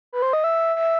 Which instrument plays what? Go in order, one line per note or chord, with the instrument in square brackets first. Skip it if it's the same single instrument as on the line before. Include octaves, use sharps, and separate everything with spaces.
[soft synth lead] B4
C5
D#5
E5
E5